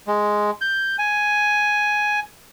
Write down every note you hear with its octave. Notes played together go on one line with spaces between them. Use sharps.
G#3
G6
G#5